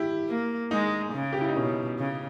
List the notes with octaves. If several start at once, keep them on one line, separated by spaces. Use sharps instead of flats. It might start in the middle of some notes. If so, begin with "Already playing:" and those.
Already playing: E4 G4
A#3
G#3 D#4
C#3
G4
E4
D#4
B2 C#4
C#3